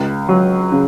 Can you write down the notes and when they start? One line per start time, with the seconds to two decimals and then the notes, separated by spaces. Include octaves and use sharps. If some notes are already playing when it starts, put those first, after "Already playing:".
Already playing: C#2
0.29 F#3
0.72 C#3